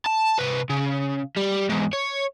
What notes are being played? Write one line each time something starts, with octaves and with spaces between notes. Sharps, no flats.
A5
C3 B4
C#3
G3
E2 G#2
C#5